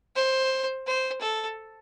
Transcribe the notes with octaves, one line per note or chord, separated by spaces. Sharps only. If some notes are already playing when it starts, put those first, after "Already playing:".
C5
C5
A4